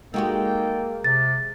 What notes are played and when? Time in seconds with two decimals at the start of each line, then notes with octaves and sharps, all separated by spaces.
0.14 G#3 A#3 D#4 F#4 G4 A4 G5
1.04 C3 A6